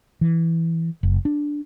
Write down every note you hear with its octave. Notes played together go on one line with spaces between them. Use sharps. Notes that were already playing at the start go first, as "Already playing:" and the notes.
E3
F#1
D4